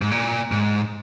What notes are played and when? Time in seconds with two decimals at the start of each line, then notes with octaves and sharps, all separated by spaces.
0.02 G#2
0.11 A#2
0.52 G#2